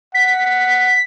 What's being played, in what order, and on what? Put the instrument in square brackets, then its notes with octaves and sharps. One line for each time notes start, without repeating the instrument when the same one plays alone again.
[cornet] F#5 [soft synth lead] B6